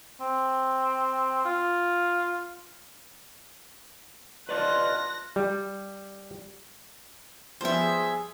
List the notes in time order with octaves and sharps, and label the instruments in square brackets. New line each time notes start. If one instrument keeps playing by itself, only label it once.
[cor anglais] C4
F4
[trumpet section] D4 F4 [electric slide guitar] B4 D5 D#5 [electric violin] F#6 A#6
[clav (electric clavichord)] G3
[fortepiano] F3 G3 B3 [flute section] G#4 [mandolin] C5 E5